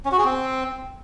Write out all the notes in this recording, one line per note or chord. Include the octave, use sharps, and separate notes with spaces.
C#4
F#4
G#4
C4